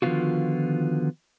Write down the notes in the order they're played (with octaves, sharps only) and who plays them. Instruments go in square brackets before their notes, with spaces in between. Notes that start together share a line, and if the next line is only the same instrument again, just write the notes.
[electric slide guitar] D3 D#3 F3 B3 F4 F#4